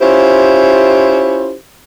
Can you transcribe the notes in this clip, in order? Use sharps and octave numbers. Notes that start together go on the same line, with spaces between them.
C#4 E4 F4 G4 C5